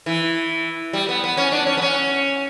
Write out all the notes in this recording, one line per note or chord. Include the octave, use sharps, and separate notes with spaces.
E3
G3
B3
B3
C#4
D4
C#4
B3
C#4